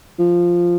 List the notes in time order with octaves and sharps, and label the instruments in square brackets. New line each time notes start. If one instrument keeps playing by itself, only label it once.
[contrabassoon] F3